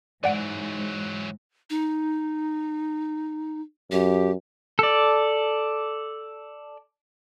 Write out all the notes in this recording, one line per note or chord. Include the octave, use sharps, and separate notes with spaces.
G#2 E3 F#3 D5 F#5 D7
D#4
F#2 G4
A4 D5